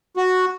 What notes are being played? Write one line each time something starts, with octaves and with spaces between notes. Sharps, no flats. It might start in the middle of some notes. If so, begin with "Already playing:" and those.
F#4